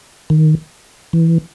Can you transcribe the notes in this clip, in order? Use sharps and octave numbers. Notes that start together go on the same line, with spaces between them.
D#3
E3